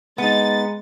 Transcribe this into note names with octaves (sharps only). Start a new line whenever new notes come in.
G#3 B3 D#4 A6